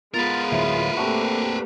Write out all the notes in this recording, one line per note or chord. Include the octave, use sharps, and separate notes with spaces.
G#3 B3 F4 A#4 B4 A6
D2 A2 F#3 E5 B5
A3 A#3 C4 D4 F#4 G4